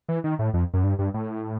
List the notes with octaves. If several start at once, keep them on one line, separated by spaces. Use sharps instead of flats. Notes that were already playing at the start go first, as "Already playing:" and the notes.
E3
D#3
A2
F2
F#2
G2
G2
A2